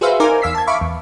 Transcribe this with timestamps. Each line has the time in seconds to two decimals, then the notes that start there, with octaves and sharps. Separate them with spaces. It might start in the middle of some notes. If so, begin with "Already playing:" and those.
0.01 F#4 G#4 B4 C5 E5 F5
0.20 D#4 A#4 C5 F5 G#5 D6
0.42 E2 F5 E6 B6 C7
0.55 A5 G#6
0.67 E5 F5 B5 C#6 D6
0.81 E2